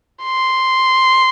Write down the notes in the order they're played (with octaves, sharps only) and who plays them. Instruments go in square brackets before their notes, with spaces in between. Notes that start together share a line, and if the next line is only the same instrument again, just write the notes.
[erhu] C6